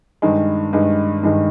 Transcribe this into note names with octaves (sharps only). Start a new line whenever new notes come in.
G2 D#3 G#3
G2 D#3 G#3
G2 D#3 G#3